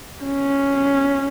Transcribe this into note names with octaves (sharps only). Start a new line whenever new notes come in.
C#4